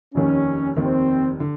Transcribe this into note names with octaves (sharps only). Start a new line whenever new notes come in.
F1 D#2 D#3 C#4
F1 D#2 D#3 C4
D3